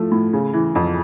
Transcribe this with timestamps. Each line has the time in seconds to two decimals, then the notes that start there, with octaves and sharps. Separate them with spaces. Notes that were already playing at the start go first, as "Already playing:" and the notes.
Already playing: F3 A3
0.12 A2
0.33 C#3
0.53 E3
0.75 F2